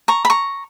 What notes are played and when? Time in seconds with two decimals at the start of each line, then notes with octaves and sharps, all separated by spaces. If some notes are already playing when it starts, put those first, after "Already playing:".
0.08 A#5 C#6
0.25 B5
0.30 A#5 C#6